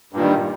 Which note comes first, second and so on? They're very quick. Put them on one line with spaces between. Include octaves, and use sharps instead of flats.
G2 A#2 D#3 G3